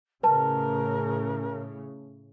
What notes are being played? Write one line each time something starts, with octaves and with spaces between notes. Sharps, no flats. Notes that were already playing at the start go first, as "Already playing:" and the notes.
A2 C#3 A#4 B4 A5